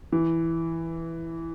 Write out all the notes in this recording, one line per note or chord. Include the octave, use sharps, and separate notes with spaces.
E3